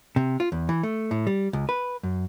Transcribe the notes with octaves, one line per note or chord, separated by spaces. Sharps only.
C3
F4
E2
E3
A3
A2
G3
C#2
B4
F#2